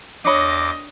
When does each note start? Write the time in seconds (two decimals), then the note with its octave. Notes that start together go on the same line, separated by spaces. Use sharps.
0.25 E2 D4 C#5 D#5 B5 D6 A#6